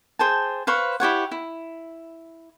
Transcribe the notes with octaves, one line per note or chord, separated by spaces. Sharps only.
G#4 C5 G5 A5
B4 C5 F5 C#6
E4 G4 C#5 F#5
E4